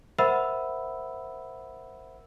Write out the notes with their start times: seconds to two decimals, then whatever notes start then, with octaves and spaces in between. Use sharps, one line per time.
0.19 A#4 C5 E5 F#5 B5 E6